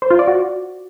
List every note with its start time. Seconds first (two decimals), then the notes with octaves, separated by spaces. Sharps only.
0.02 C5
0.11 F4
0.19 D5
0.27 F#4